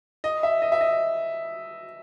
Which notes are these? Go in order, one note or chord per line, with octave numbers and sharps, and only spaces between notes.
D#5
E5
D#5
E5
D#5